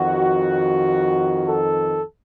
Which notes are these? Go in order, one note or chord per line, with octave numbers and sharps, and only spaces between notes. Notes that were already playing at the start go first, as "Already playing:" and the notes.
Already playing: F2 D#3 F#4
A4